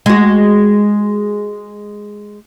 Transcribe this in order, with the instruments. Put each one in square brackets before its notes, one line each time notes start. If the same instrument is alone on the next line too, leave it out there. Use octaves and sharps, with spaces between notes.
[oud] G#3 F#4